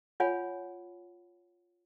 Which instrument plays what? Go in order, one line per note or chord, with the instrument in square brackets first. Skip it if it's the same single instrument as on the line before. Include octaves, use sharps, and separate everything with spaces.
[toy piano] F4 C#5 F#5 G#5 B5